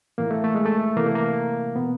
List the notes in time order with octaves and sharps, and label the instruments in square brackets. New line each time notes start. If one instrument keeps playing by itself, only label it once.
[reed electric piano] A2 E3 A#3
A3
A3
G#3
A3
C3 E3 A#3
A3
A#3
B2 B3